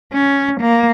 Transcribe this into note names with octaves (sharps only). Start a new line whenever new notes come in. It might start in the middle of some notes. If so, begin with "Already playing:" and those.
C#4
A#3